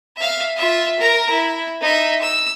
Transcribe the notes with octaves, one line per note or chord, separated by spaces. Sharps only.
E5 F5
F4 E5
A#4 A#5
E4
D#4 E5
E6